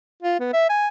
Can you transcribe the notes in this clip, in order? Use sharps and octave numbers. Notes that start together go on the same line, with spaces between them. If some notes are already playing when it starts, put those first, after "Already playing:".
F4
B3
E5
G#5